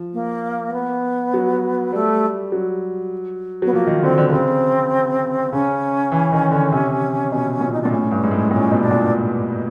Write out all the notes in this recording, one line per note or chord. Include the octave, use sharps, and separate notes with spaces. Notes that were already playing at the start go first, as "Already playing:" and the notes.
Already playing: F3
A#3
B3
F#3
G3 A3
F#3
F#3 B3
F3 A#3
D#3
D3 C4
D3
B3
C#3 C4
C#3 C#4
E3
D#3
D3
C3
B2
A#2
D#4
A#2 D4
A2 C#4
G2
G#2
A2
A#2 C#4
B2
D4
A#2